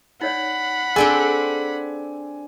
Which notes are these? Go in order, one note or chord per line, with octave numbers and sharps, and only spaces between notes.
D#4 C#5 D5 F#5 B5
C4 D4 G#4 A4 G#5